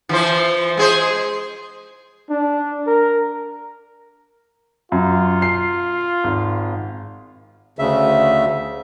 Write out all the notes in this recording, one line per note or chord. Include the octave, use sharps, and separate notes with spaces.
E3 F3 C5
G#3 G#4 C5
D4
A#4
F#2 F4
C7
G#1
D2 C#3 E5